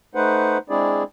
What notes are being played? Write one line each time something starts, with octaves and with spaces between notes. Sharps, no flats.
A3 D#4 B4 C5 F#5
G#3 C4 D4 E4 G#4 D5